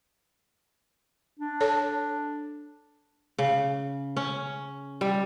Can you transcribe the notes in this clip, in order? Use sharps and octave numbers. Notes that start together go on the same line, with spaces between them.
D4
A4 C#5 A5
C#3
C#4
G3